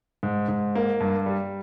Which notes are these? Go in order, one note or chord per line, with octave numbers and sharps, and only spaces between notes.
G#2
G#2
A#3
G2
G3